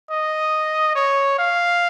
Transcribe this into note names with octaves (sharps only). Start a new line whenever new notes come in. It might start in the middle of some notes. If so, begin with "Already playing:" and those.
D#5
C#5
F5